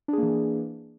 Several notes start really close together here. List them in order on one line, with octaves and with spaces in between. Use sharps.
D4 G#4 A#3 E3